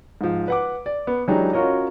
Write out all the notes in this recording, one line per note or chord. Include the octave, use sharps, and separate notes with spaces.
G#2 F3
B4 F#5 D6
D5
B3
E3 F#3 G#3 D4 D#4 G4
C#4 F4 F#4 A#4 C#5 D#5